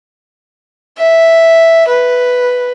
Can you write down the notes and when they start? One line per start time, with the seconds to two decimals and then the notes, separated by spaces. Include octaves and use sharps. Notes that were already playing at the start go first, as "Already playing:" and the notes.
0.98 E5
1.87 B4